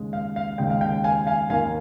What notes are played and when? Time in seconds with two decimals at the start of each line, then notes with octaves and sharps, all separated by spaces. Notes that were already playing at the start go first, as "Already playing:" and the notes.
Already playing: D#2 C#3 G#3
0.13 F5
0.36 F5
0.58 D#2 C#3 G#3 G5
0.70 F5
0.81 G5
1.04 F5 G#5
1.27 F5 G#5
1.50 D#2 D#3 A#3 F5 G#5